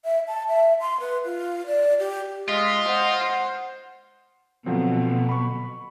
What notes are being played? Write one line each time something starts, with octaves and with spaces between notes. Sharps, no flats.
E5
A5
E5
C6
B4
F4
D5
G4
G#3 F4 D#5 B6
C5 F#5
B2 D3 F3 F#3 C4
B5 C#6